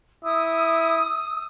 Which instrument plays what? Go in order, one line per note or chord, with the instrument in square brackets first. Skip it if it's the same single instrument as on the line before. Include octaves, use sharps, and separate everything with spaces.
[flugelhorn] E4 [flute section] D#6 E6